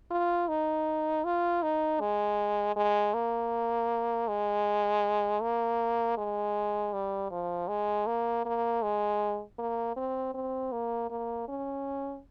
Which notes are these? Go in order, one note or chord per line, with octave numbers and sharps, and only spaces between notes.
F4
D#4
F4
D#4
G#3
G#3
A#3
G#3
A#3
G#3
G3
F3
G#3
A#3
A#3
G#3
A#3
C4
C4
A#3
A#3
C#4